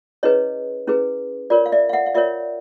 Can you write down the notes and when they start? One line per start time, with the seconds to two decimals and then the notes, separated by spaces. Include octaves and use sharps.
0.23 C#4 E4 G#4 B4 C#5 D#5
0.87 C#4 E4 G#4 B4
1.50 F4 A#4 C#5 D5
1.66 F5
1.72 D5 E5
1.89 F5
1.93 E5 F#5
2.06 F5
2.14 F4 A#4 C#5 D5 E5